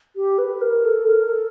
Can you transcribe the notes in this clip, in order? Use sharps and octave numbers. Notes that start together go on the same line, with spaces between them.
G4
B4
A#4
A4
A#4
A4